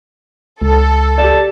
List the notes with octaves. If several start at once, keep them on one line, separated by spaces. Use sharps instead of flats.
C#2 A4
G4 D5 A5